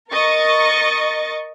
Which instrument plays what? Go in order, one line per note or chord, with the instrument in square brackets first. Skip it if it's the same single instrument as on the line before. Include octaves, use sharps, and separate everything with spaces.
[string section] A#4 D#5 C#6 A6